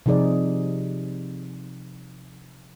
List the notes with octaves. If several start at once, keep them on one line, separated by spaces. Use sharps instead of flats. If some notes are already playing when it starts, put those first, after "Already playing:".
C3 F3 D#4 G#4 D5